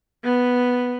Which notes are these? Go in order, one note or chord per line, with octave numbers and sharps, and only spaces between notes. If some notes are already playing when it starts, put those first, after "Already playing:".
B3